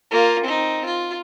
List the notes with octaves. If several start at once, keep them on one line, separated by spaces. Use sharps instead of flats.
A#3 F4
C4 D#4
F4